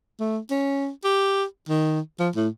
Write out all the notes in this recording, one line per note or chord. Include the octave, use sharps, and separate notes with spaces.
A3
C#4
G4
D#3
F3
A2